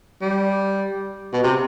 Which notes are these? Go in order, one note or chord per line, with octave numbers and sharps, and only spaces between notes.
G3
B2
C3